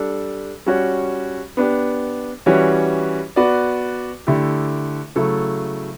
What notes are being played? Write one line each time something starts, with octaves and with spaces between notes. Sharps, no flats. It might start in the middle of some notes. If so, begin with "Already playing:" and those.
Already playing: G3 D4 A4
G3 C#4 F#4 C#5
B3 D4 G4
E3 G3 C#4 F#4 C#5
B3 F#4 B4 D5
D3 A3 E4 G4
C#3 F#3 A3 E4 A4